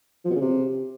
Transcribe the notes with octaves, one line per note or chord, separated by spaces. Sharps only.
F3
B2
C#3
C3